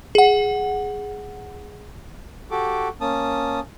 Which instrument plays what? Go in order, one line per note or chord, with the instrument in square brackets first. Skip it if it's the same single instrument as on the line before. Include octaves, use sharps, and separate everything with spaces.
[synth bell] G#4 F#5
[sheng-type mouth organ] F#4 G4 A4 D6
A#3 C#4 A5 D#6